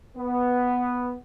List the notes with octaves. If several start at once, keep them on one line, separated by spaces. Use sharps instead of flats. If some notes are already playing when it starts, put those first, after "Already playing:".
B3